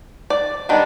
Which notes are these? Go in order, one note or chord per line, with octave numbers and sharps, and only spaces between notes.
D5
D#3 G3 B3 D4